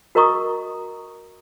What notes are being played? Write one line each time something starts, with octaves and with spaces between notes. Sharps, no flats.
F#4 A#4 D#5 A#5 C#6 D#6